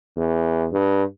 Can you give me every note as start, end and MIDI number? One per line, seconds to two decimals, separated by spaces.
0.17 0.67 40
0.72 1.03 43